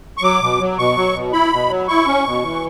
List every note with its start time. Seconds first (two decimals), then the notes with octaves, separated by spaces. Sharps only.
0.18 C#6
0.22 F#3 D6
0.41 B2
0.60 F#3
0.78 B2 C#6
0.96 F#3
1.14 B2
1.33 E4 B5
1.52 B2
1.70 F#3
1.88 E4 C#6
2.07 C#4
2.25 B2
2.43 E3